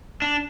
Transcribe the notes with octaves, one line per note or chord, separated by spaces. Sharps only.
D4